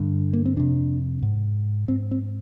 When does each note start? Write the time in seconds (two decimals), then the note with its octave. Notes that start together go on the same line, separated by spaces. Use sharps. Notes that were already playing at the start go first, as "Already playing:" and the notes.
Already playing: G2 D3
0.33 A#3
0.46 C4
0.56 F2 C3 D4
1.23 G#2
1.88 G#2 C4
2.11 C4